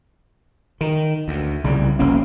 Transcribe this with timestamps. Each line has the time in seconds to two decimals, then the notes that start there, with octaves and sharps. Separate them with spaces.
0.81 D#3
1.28 D2
1.64 C2 C#3 G3
1.99 F1 A#3 C#4